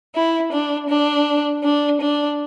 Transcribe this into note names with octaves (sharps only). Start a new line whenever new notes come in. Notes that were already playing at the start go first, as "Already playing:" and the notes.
E4
D4
D4
D4
D4